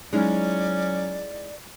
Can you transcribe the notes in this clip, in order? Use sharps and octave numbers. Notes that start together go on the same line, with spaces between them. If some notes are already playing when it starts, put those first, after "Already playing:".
F#3 G#3 C#4 D#4 E4 D5